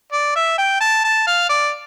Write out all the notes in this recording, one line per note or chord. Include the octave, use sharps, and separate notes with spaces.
D5
E5
G5
A5
A5
F5
D5